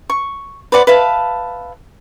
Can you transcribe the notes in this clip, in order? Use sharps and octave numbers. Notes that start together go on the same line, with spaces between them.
C#6
B4 C5 D5 F#5
B4 E5 F5 A5